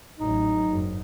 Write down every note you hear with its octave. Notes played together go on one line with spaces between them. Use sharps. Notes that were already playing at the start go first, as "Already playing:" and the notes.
A1 A2 F#3 D#4
F#1 G#2